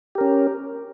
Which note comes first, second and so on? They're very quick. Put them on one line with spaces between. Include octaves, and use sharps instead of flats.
G4 A#4 C#4